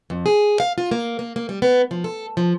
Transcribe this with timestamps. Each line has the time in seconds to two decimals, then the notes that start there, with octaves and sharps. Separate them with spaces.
0.10 F2
0.26 G#4
0.60 F5
0.78 F4
0.91 A#3
1.19 A#3
1.36 A#3
1.49 G3
1.62 B3
1.91 F3
2.04 A4
2.37 F3